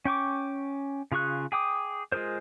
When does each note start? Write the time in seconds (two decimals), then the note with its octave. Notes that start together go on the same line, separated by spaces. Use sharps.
0.05 C#4 G5 C#6 D6
1.12 C#3 F4 G#4 C#6 F#6
1.52 G#4 G5 D6 D#6
2.12 G#3 F4 G#4 A#4 C5